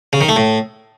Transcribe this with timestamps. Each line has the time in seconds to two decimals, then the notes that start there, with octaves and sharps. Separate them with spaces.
0.13 C#3
0.21 D#3
0.29 A3
0.36 A2